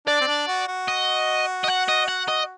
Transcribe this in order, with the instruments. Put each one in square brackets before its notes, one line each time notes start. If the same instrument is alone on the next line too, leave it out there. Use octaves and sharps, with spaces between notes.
[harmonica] D4 [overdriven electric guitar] D5
[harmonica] C4
D4
F#4
F#4
[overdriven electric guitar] D#5
D#5
F#5
D#5
F#5
D#5